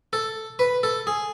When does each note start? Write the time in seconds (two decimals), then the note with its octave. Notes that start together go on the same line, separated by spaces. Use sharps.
0.13 A4
0.59 B4
0.83 A4
1.07 G#4